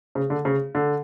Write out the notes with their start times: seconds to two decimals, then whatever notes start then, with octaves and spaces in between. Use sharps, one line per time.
0.15 C#3
0.30 D3
0.45 C#3
0.75 D3